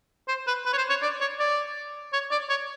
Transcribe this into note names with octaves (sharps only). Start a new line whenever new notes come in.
C5
B4
B4
C#5
C5
C#5
D5
C#5
D5
C#5
D5
C#5